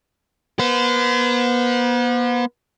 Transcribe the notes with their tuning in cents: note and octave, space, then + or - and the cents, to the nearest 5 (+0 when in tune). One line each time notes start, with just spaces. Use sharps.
B3 -40 C5 -40